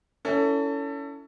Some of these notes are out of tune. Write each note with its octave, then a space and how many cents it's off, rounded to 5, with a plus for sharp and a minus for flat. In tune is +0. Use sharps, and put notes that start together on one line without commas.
C#4 +30 E4 +0 A4 +25